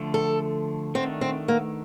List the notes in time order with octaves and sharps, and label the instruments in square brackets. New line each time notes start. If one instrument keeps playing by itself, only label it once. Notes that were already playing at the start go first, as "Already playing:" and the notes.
Already playing: [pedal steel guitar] D3 F3 A3
[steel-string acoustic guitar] A4
[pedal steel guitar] D#3 A3 D4 [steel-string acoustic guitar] C4
[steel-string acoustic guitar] C4
A#3